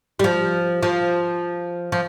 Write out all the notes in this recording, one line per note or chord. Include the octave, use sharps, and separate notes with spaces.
G3
F3
F3
F3